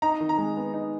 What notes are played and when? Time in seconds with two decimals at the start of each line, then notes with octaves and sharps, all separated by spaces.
0.02 D#4 A#5
0.20 D#3
0.29 A#5
0.38 G#3
0.57 B3
0.74 D#4